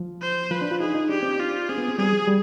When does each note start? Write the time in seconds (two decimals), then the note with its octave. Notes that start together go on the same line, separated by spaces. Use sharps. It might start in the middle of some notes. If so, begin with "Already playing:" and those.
Already playing: F3
0.21 C5
0.51 F3 B4
0.62 D4
0.71 F4
0.80 D#4 G#4
0.95 D#4
1.09 D4 G4
1.23 C4
1.36 D4 F4
1.69 C4 G#4
1.78 B3
1.88 C4
1.97 G3 G#4
2.12 F3
2.27 G3